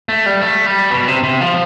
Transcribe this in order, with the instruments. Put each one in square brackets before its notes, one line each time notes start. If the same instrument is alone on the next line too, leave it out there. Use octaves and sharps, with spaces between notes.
[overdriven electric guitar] A3
G3
A3
G3
B2
C3
C3
F3